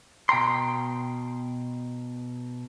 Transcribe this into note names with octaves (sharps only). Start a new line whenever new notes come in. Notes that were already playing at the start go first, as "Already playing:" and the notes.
B2 G5 A#5 C6